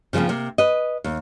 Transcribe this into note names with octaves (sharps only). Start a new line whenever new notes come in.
C#3 F3 G3 A#3 C4
C3 A#3
B4 D#5
D#2